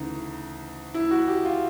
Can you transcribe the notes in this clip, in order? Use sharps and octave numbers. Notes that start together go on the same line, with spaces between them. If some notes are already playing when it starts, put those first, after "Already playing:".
Already playing: D2 C#3 E3 D#4
E4
F#4
G4
F4